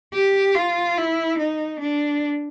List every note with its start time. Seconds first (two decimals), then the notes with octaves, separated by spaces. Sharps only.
0.14 G4
0.55 F4
0.98 E4
1.38 D#4
1.80 D4